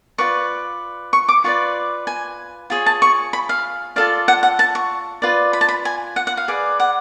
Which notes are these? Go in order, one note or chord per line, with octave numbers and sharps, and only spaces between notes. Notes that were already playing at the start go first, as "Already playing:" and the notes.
F4 B4 D5 C#6
C#6
D6
F4 B4 D5 C#6
G#5
F4 G#4 C#5
A5
C#6
B5
F5
F4 A4 D5 F5
F#5
F#5
A5
C#6
F4 B4 D5
B5
A5
B5
G#5
F#5
F#5
F5
G#4 B4 D5
F#5